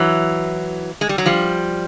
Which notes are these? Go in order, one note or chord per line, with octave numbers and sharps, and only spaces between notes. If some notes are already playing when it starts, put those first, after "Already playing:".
Already playing: E3 F#3
G#3
G3
F#3
F3 G3